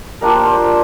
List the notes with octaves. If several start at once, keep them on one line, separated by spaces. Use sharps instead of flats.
G3 A#3 D4 F4 A#4
C5
C5